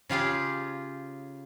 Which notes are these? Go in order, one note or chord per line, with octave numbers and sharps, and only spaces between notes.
C#3 F4 G4 G#4